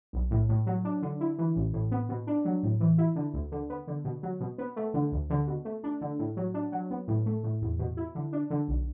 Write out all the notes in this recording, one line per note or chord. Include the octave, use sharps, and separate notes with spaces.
B1
A2
A2
F#3
D4
D3
E4
E3
A1
A2
B3
B2
D4
F#3
A2
E3
E4
D3
D2
D3
B3
D3
B2
F#3
B2
B3
A3
D3
D2
D3
B2
A3
D4
D3
A2
F#3
D4
F#3
B3
A2
A3
A2
E2
B2
E4
D3
D4
D3
B1